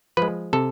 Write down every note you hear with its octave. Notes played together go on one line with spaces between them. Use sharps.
F3 G#3 B4
C3 A4